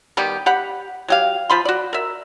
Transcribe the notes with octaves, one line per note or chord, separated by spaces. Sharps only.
D#3 G3 B3 G4
G4 F#5 B5
F#3 G4 F5
F3 B5 C6
F#4 D5
A#4 E5